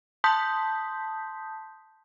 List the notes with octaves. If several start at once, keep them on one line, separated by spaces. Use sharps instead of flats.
A5 C6 D#6 G6 B6